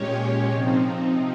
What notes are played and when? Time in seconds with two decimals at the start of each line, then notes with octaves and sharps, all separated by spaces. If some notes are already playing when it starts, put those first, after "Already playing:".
Already playing: A#2 G#3 C#4 G4 C#5
0.49 C3 F3 C4 D#4